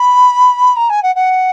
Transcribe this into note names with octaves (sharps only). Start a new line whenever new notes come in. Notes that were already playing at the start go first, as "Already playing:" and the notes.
Already playing: B5
A#5
G#5
F#5
F#5